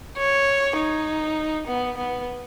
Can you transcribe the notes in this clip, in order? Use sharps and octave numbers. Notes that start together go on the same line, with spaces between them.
C#5
D#4
B3
B3